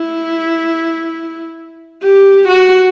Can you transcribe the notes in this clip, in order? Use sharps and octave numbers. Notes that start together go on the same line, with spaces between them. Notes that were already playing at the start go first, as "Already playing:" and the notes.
Already playing: E4
G4
F#4